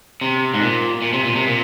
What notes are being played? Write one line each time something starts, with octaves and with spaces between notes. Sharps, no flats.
C3
G#2
A#2
A#2
C3
A#2
C3
A#2